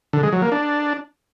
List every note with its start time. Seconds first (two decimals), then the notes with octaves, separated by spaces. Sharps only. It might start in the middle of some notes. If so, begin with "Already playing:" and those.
0.13 D3
0.23 G#3
0.33 F#3
0.42 A#3
0.52 D4